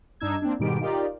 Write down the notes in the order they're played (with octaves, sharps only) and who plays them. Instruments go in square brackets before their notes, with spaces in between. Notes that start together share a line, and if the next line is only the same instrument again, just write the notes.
[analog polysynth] G2 D4 D#4 E6 G#6
A#3 C4 D4
G#2 B2 D#3 G3 G4 D7
D#4 F4 G4 A#4 D5